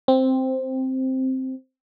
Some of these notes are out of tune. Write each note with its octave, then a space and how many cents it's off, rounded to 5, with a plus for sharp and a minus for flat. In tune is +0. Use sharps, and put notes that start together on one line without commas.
C4 +0